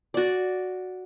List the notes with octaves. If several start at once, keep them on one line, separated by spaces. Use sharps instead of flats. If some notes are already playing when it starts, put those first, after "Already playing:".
F#4 D5